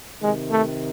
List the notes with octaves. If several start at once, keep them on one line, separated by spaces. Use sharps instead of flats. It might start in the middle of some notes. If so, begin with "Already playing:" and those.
C3 D#3 G#3
A3